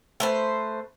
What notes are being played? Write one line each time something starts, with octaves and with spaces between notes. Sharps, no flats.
A3 B4 C5